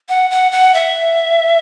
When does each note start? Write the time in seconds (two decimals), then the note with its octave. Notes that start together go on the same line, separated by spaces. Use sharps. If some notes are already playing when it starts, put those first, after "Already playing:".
0.09 F#5
0.30 F#5
0.52 F#5
0.74 E5